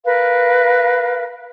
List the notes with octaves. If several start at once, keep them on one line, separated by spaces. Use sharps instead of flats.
A#4 B4 F5